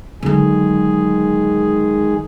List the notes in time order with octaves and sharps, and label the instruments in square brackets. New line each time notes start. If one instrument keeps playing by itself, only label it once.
[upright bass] D3 F#3 [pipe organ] D#3 G#3 G#4